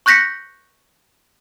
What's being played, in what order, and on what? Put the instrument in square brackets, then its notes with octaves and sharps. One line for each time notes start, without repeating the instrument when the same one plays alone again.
[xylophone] C#6 F#6 G6 A#6 B6 C#7